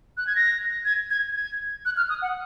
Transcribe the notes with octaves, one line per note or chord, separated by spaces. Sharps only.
F#6
G#6
A#6
G#6
G#6
G#6
F#6
F6
D#6
F#5